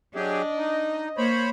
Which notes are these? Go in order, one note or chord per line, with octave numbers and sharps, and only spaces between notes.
F#3 D4 G4 G#4 D#5
D#4
A#3 C5 C#5 B5